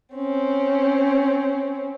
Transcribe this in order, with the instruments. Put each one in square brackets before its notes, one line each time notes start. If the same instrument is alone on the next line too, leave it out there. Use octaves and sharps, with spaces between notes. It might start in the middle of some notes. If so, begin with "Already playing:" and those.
[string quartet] C4 C#4